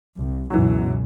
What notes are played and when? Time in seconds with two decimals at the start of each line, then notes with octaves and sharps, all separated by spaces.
0.15 C2
0.50 C#2 F#2 B2 E3 F#3